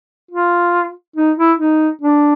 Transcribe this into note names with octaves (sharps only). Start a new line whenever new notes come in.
F4
D#4
E4
D#4
D4